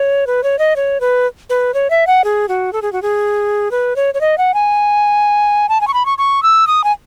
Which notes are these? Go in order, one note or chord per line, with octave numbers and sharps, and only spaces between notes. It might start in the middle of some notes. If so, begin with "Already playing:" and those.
Already playing: C#5
B4
C#5
D#5
C#5
B4
B4
C#5
E5
F#5
G#4
F#4
A4
G#4
F#4
G#4
B4
C#5
C#5
D#5
F#5
G#5
A5
G#5
C#6
B5
C#6
C#6
E6
D#6
G#5